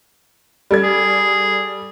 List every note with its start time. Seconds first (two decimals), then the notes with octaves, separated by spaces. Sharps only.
0.71 G3 A4 G#6
0.83 G#4